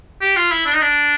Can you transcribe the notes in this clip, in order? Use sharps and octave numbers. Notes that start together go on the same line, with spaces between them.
G4
F4
E4
D4
D#4
D4